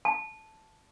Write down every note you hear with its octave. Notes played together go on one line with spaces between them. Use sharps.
A5